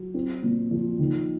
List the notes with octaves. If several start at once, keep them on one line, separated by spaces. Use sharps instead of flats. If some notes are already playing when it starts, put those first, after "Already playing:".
Already playing: F#3
C4
A#2
F3
D#3